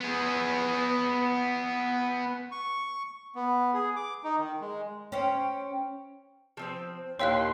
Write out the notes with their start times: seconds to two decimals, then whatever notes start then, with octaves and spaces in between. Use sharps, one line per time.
0.01 B3 G#4
2.52 C#6
3.35 B3
3.74 G#4
3.96 D6
4.24 D#4
4.38 D#3
4.61 G#3
5.12 C#4 C5 G5
6.57 F3 C4 C5
7.19 D#2 A#2 E4 C#5 F5 G5 C6 F#6